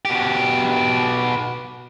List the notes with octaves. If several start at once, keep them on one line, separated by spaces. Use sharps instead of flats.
B2 G4